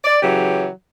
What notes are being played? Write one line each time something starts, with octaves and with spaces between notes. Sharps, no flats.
D5
C#3 E3 F#3 G4